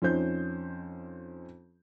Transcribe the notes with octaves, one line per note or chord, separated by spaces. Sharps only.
F2 C#4 D#4 C5 G6